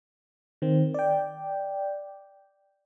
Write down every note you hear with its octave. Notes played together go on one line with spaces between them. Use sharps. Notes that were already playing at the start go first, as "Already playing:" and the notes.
D#3 C4
D5 G5